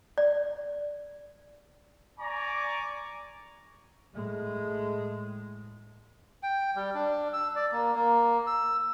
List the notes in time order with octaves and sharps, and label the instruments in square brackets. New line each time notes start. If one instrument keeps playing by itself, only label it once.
[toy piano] D5
[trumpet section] D5 G#5 A#5 C#6 D6
[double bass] A2 G#3
[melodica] G5
G3
D4
E6
D5
A#3
A#3
E6